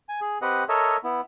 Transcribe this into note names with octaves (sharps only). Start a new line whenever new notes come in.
G#5
G#4
C4 G4 B4 D#5 F#5
A4 A#4 C#5 D#5 E5
B3 E4